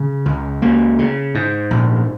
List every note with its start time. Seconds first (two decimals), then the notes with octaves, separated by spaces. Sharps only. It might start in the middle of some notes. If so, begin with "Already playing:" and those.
Already playing: C#3
0.26 C#2
0.62 C#2 A#3
0.99 C#3
1.35 G#2
1.71 A#1